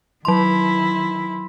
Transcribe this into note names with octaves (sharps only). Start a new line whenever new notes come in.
D#3 F#3 E4 C6